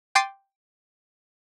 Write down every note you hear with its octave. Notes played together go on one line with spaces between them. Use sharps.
G5 C6 D6 A6 C7 D#7